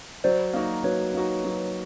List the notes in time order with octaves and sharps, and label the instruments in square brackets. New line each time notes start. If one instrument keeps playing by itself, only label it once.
[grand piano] F#3 [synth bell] C5 D5
[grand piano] A#3 D#4 F#4
[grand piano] F#3 [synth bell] B4 C#5
[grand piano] A#3 D#4 F#4
F#3